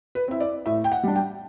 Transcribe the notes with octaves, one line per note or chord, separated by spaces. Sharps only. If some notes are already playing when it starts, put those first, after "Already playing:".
B4
C4 E4 E5
D5
A2 E5
G5
F#5
G3 D4
G5